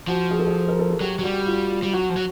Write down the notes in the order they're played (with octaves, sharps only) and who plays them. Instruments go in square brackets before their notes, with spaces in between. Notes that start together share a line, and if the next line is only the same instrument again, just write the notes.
[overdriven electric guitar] F3 [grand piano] F#4
[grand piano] G#4
A4
G#4
A#4
A4
G#4
[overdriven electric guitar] F#3 [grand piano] G4
[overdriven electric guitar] F#3
[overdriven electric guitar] G3 [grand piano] F#4
[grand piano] F4
F4
[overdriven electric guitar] G3
[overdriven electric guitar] F#3 [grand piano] F#4
[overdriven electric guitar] F3
F#3